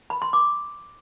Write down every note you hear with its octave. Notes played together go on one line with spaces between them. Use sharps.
B5
C6
D6